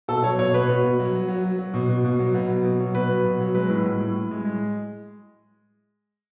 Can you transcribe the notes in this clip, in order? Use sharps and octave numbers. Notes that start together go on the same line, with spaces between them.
B2 A4
F#3 C#5
B2 C#5
B2 B4
B2
B2
F#3
F#3
F#3
F#3
F#3
B2
B2
B2
F#3
B2
F#3
B2
F#3
B2 B4
F#3
B2
F#3
G#3 B4
A2
A2
A2
A2
G#3
G#3